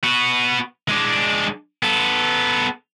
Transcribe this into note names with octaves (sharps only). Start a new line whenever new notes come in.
B3 F#4
G#3 D4
B3 A4